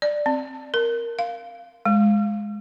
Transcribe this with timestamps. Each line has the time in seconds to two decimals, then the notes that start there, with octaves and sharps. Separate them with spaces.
0.02 D5
0.26 C4
0.74 A#4
1.19 F5
1.85 G#3